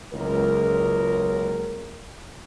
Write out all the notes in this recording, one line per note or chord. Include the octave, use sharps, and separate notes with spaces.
F#1 C#2 A#4